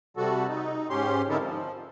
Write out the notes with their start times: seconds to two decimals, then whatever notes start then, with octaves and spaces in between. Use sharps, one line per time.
0.17 C3 G3 F#4 A4
0.48 D#4
0.90 G#2 C#4 G4 C6
1.29 D3 C4 D#4 E4 A4 A#4
1.42 F3